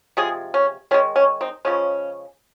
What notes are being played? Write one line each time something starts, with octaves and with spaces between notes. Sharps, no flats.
C3 F3 G#3 G#4
C#4
D#3 G#3 C#4
C#4
C4 D#4
C#3 F3 G#3 C#4